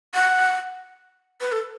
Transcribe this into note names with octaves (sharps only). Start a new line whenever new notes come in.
F#5
B4
A4